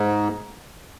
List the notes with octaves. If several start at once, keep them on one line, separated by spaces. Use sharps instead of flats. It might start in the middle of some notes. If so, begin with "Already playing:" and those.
Already playing: G#2